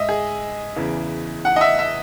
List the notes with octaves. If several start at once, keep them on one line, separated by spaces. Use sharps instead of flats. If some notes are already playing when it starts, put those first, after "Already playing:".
Already playing: G#2 D#5 E5
G#4
E2 C#3 E3
F#5
D#5
E5
E5